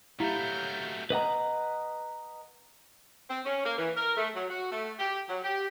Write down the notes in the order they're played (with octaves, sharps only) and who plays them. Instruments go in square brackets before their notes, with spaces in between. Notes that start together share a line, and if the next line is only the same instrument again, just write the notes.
[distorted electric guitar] F#3 A3 [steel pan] E4 [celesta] G4 F5 A#5 [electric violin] F6 G6
[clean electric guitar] B4 D#5 F#5 A#5
[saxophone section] C4
C#4
A#3
E3
A#4
A3
F#3
F#4
A3
G4
F#3
G4